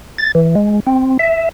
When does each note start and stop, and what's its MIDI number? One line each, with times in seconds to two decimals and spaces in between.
0.18 0.32 93
0.35 0.55 52
0.55 0.80 56
0.87 1.17 60
1.19 1.49 76